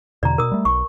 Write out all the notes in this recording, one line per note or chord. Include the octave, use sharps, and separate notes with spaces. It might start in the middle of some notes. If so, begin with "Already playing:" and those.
E2 B2 D3 D5 A#5
B2 A#4 D#6
G3 A3
B1 C#6